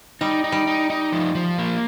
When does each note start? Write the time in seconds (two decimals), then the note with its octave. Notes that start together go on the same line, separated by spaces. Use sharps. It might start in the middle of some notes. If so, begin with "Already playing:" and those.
0.21 G3 D#4
0.44 D#4
0.52 G3
0.67 D#4
0.90 D#4
1.12 F3
1.35 F3
1.58 A#3